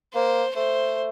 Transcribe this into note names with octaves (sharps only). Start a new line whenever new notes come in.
A#3 C5
A3 C5